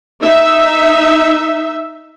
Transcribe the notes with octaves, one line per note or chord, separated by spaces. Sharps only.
D#4 E5